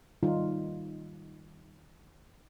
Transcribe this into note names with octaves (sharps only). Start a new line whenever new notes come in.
D#3 G3 D#4 F4